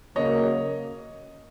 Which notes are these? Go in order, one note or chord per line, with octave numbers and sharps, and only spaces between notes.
C#3 F#3 A#3 C#5 D#5